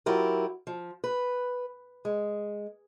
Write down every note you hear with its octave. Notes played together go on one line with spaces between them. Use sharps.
F#3 E4 F4 G4 A#4
F3
B4
G#3